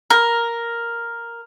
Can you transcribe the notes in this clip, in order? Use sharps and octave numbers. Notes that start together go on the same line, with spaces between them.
A#4